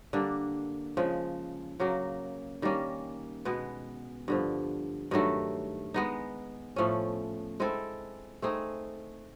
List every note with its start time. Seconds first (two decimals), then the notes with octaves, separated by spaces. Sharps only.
0.13 D3 G3 A#3 D4
0.97 C#3 F3 G#3
1.80 C#3 F#3 A#3
2.62 D#3 G3 A#3 C#4
3.45 B2 G#3 B3
4.28 G2 D3 F3
5.11 G2 D#3 F#3 A3
5.94 G#3 B3 D#4
6.76 A2 F3 A3 C#4
7.60 G#3 C4 E4 A4
8.42 A3 C4 D#4 G#4